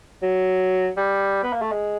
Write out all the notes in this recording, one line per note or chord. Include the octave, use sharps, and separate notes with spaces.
F#3
G3
B3
A#3
A3
G#3